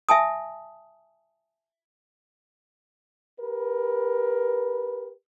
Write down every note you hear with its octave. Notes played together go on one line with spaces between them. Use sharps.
E5 G#5 A5 D#6
G4 A#4 B4